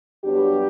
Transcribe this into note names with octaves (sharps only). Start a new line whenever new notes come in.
G2 F#3 B3 D4 G4